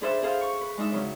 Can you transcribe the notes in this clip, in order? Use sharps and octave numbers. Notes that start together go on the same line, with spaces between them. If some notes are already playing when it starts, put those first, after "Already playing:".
D4 G#4 A4 B4 C5 E5
G#4 A4 C5 F5
C#6
B4
G#3 D4 D#4 E5
C#3 F#3 C#4